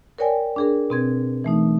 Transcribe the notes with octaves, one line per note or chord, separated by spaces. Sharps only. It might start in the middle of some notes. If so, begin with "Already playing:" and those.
A#4 B4 C#5 D5 G5 G#5
D4 G#4 A#4
B2 C4 G#6
E3 A3 D#4